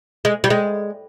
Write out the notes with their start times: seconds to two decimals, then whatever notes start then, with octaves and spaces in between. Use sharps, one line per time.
0.25 G#3
0.44 G3
0.50 G#3